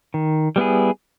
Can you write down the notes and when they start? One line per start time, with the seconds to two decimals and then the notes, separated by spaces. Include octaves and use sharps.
0.14 D#3
0.56 G3 B3 E4 G#4